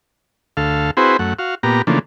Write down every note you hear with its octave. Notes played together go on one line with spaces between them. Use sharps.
D2 A4 F5
C4 E4 F#4 G#4 B4 C5
F#2 A3 F#5
F#4 F5
A#2 B3 G4 A#5
C#3 E3 F3 A3 A#3 D4